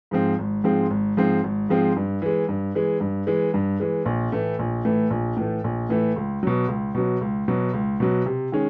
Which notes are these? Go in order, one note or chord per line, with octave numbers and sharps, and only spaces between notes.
G#2 F3 G#3 C4
G#1
G#2 F3 G#3 C4
G#1
G#2 F3 G#3 C4
G#1
G#2 F3 G#3 C4
G2
E3 G#3
G2
E3 G#3
G2
E3 G#3
G2
E3 G#3
A#1
A2 E3 A3
A#1
A2 E3 A3
A#1
A2 E3 A3
A#1
A2 E3 A3
C#2
B2 F#3
C#2
B2 F#3
C#2
B2 F#3
C#2
B2 F#3
C3
D#3 G#3 C#4